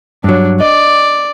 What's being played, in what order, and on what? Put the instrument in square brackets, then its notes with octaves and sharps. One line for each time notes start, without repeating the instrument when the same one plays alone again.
[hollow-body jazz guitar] G2 F#3 [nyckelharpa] D4
[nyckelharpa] D5 [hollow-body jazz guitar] D#5